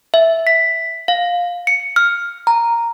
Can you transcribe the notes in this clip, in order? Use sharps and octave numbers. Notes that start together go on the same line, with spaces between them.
E5
B6
F5
C#7
F6
A#5